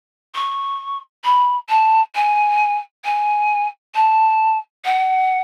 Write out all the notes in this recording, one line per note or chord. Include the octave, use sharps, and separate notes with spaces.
C#6
B5
A5
G#5
G#5
A5
F#5